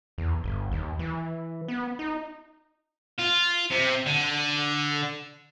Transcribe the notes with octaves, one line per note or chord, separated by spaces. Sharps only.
E2
G1
D#2
E3
B3
D#4
F4
C3
D3